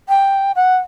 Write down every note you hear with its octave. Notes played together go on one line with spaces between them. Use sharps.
G5
F#5